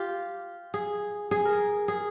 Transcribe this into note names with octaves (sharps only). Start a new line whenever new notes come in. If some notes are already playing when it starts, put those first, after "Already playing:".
Already playing: F4 G4
G#4
G#4
A#4
G#4